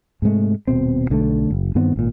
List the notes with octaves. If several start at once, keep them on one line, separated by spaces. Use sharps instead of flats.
G#2 C3 G#3 A3
D#1 B2 C4
B1 D3 G#3 A3
F#1
G2 D#3 B3 C4
G#1 A#2